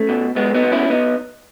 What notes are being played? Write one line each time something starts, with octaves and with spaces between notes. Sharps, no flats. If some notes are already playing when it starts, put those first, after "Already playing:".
Already playing: A3 C#4
B2
B1 G#3 B3
B3 D#4
B2
C#4 E4
B3 D#4